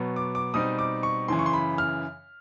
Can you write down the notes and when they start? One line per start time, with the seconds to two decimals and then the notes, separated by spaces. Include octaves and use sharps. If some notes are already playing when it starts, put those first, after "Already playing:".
Already playing: B2 F#3 B3
0.16 D6
0.35 D6
0.54 B2 G3 C4 D#4 D#6
0.79 D6
1.03 C#6
1.28 F#2 C#3 E3 C6
1.39 C#6
1.46 C6
1.53 B5
1.78 F6